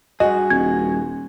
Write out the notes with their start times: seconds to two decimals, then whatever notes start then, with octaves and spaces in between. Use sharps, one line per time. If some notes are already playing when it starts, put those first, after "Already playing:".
0.20 G2 F#4 G#4 D#5
0.50 D#1 G#6